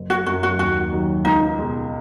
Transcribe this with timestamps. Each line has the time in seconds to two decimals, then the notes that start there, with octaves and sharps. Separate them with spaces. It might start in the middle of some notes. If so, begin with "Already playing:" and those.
Already playing: F#1
0.10 F#4
0.26 F#2 F#4
0.30 F#3
0.43 F#4
0.59 D#2 F#4
0.93 D#3 F#3
1.25 C#2 D#4
1.59 B2 G#3